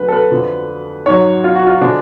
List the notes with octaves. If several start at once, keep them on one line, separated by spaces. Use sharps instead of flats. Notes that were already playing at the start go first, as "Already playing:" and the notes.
Already playing: D2 D3 F#3 B4
A4
B4
F2 D3 F3
G#2 F#3 C#5
F4
F#4
F4
D3 F3 G#3 D4